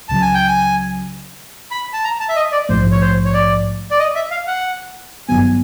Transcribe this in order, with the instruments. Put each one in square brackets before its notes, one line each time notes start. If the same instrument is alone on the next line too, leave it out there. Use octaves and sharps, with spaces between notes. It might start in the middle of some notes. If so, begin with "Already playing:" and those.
[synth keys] C#2 C#3 F#3 [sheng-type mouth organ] A5
[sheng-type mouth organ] G#5
G5
G#5
B5
A5
A#5
A5
E5
D#5
D5
[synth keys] A#1 G#2 F3 A3 [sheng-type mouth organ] C5
[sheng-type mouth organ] C#5
C5
C#5
D5
D5
D#5
E5
F5
F#5
[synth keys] G#1 G2 D#3 F#3 B3 [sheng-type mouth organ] G#5